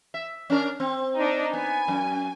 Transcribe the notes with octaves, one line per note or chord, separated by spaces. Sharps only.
E5
C#4 D4 A#4
C4
D4 D#4
B3 G#5
F#2